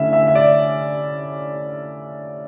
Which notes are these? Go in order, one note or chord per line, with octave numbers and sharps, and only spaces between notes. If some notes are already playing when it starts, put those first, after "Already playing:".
Already playing: D3 A3 C#4 E4 E5
E5
E5
D5